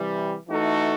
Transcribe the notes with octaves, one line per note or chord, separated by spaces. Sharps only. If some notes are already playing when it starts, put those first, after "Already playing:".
Already playing: C3 E3 G3
E3 A3 D#4 F#4 A4